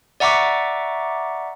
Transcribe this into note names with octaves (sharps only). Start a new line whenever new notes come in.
D5 E5 F#5 A#5 C#6 D6